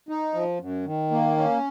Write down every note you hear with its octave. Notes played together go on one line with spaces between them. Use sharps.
D#4
F3
F#2
D#3
A#3
C#4